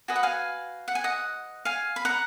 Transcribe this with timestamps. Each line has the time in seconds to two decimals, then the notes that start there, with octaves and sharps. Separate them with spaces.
0.08 F#4 B4 D#5 G#5
0.16 F#5
0.23 F5 G#5
0.88 F#5
0.95 G#5
1.04 D#5 F#5
1.65 F5 G#5
1.96 B5
2.05 F#5 A#5